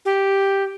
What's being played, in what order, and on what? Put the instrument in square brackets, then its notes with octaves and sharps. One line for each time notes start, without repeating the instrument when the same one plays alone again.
[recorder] G4